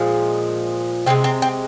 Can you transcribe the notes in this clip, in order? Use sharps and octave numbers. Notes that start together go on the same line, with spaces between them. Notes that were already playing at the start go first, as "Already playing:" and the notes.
Already playing: A#2 F3 G#3
C3 D#3 G#3 C4
C4
C4